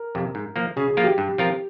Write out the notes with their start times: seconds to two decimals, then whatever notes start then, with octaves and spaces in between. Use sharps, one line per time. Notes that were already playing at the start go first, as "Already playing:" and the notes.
Already playing: A#4
0.15 F2 C3
0.35 G#2
0.56 F3 A#3
0.77 C#3 G#4
0.90 G#4
0.97 F3 A#3 F4 A#4
1.04 G4
1.18 G2
1.38 F3 C4 F4 A#4